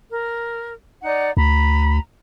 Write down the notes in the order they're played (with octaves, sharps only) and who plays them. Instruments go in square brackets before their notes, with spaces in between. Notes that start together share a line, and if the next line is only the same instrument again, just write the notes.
[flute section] A#4
D#4 D5 F#5
[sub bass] D2 [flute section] A#5 B5